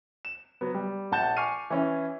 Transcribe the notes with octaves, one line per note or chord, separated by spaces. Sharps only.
E7
F#3 B3
G3
A#1 F#5 A5 G6 A6 E7
G#5 C#6 D6 F6 C7 D#7
E3 C#4